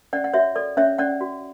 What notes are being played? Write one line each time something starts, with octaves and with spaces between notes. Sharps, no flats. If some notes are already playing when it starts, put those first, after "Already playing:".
C#4 D5 F#5
F#5
F#4 C#5 E5
A4 D5
C#4 C#5 E5
C#4 D5 F#5
F#4